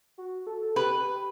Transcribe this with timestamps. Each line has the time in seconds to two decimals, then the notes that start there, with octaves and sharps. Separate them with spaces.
0.18 F#4
0.47 A4
0.62 A4
0.76 G4 B4